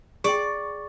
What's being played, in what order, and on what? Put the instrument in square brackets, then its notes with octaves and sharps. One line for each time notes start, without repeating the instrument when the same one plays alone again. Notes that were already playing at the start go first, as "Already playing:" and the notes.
[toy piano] G#4 G5 [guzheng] D5 [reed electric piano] C#6